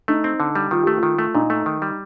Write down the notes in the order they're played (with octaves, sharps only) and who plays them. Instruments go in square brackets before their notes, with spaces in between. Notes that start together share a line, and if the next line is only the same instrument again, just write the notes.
[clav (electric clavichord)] A3 [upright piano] D#4
[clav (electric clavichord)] C4
D3
G3
[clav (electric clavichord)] D#3 [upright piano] F4
[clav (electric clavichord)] A3 [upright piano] G4
[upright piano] F4
[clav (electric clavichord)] D#3
A3
[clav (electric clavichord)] A#2 [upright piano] D#4
[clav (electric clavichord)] A3
D#3
G3